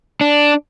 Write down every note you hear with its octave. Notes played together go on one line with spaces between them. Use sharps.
D4